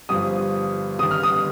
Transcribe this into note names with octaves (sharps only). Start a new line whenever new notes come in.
G1 G2 F3 D#6
G1 G2 D#3 D#6
F6
D#6